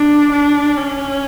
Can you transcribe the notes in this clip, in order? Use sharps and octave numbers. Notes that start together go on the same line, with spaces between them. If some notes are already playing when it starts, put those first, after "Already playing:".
Already playing: D4
D4
C#4